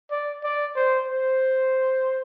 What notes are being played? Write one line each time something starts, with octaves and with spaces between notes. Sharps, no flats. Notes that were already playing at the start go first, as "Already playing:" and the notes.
D5
D5
C5
C5